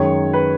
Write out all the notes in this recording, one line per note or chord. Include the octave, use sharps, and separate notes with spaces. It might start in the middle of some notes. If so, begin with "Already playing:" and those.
Already playing: F#2 D#3 G#3 C#5
B4